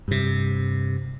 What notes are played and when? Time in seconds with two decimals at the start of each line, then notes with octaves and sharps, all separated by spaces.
0.08 G2 C3